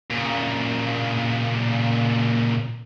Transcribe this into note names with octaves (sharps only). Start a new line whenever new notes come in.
A#2 C#3